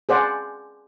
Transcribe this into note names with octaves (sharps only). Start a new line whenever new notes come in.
G#4 C5 D5 F#5